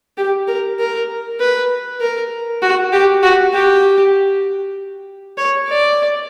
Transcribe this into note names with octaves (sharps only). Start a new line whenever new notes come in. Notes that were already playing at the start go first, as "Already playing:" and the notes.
G4
A#4
A#4
B4
A#4
F#4
G4
F#4
G4
C#5
D5